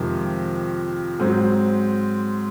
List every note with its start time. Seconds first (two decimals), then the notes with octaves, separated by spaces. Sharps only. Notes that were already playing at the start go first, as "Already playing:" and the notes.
Already playing: F2 C3 D#3 G#3
1.19 G#2 F#3 C4